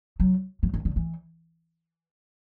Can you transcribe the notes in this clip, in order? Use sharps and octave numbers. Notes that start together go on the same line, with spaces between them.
F#3
F3
D#3
D3
E3